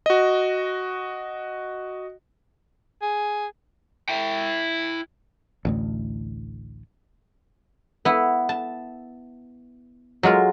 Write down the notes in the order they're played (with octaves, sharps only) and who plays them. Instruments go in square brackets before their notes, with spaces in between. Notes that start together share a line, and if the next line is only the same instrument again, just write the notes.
[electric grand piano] F#4 D#5
[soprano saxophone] G#4
[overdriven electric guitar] E4 G5
[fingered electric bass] A1 D2 A2
[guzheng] B3 E4
A5
F#3 G#3 F4 A#4